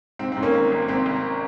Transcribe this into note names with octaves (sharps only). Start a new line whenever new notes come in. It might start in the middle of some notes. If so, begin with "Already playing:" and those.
G#2 C4
G#2 C4
A#3 C#4
G#1
G#1
G#1 C4
G#1